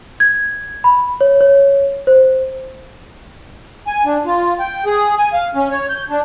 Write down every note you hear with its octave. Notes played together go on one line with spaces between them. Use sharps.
G#6
B5
C#5
C#5
C5
G#5
D4
F4
G5
G#4
G#5
F5
C#4
C#5
G6
D4